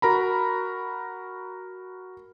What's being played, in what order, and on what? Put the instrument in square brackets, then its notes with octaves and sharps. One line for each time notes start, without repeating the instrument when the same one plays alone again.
[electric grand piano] F#4 A#4 A#5 B5